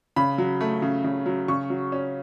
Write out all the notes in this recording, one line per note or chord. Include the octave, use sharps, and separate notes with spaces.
C#3 B5
F#3
A3
C#3
C#3
F#3
C#3 C#6
F#3
C#4